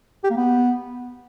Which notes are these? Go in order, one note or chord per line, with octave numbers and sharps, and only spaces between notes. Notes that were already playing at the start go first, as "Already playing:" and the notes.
G4
A#3
B3